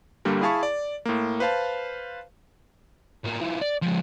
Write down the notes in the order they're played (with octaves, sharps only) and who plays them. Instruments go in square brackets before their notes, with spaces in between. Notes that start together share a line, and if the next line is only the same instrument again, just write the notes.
[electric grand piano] G2 D3 G3 A#3
E4 G#4 F5 A5 B5 C#6
D5
A2 A#3
B4 C5 F5 A5
[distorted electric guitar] A2 A#3
F3 E4
D5
F3 G#3